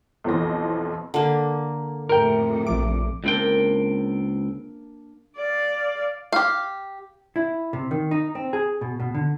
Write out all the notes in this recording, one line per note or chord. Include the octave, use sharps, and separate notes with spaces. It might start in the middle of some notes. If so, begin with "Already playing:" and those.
B1 F2 E3 C5 A#6
D3 A#3
F2 A2 C3 A#4 G5
A#1 F3 D6
C#2 A#3 C4 D4 A#4 G5
D5 F5
G4 F5
E4
C3
D#3
D#4
C4
G#4
B2
B2
D3